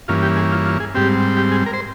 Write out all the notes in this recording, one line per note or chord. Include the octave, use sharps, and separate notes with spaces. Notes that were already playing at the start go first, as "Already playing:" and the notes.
G2 E3 A#3 C#4 F4
G4
G#4
F4
F4
G#4
G#2 G3 C4 G4
G4
G#4
A#4
C5